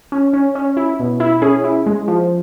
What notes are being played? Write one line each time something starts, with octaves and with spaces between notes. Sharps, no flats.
C#4
C#4
C#4
E4
B2
E4
C#4 G#4
E4
G#3
F3